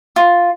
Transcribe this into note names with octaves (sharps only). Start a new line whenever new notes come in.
F4